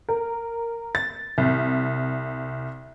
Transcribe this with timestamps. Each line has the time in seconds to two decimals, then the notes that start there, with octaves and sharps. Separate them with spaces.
0.09 A#4
0.95 A6
1.38 C2